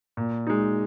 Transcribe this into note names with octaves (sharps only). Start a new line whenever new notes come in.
A#2
G#3 D#4